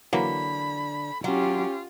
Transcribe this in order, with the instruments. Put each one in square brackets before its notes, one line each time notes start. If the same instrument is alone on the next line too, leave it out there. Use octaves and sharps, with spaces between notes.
[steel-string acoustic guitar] D3 [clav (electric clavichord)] E3 F#3 A#3 [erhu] B5
[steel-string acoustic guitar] F#3 [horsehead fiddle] C#4 G4 [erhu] F4